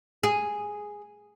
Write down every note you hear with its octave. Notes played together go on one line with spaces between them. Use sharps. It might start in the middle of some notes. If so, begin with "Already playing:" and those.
G#4